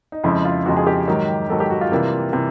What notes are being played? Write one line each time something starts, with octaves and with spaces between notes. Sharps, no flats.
D#4
F2 C#3 F3 G#3 E4
F4
F2 C#3 F3 G#3 F#4
G#4
G4
G#2 D#3 F#3
G#2 D#3 F#3 A4
G4
F#4
F4
C3 E3 G3 A#3
C3 E3